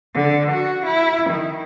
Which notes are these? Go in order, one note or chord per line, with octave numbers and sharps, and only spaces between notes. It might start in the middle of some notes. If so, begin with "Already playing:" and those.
D3
F#4
E4
D#3